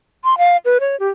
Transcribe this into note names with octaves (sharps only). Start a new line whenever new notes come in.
C6
F5
B4
C#5
G4